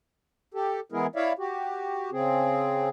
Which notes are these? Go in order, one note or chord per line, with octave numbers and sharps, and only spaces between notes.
G4 A4
E3 G#3 B3 E4 G#4 A#4
E4 C#5 D5 E5 F5
F#4 G4
C#3 C4 G#4